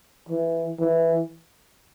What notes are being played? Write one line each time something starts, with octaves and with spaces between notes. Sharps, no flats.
E3
E3